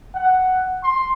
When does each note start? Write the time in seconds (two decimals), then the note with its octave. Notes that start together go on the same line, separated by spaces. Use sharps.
0.15 F#5
0.82 C6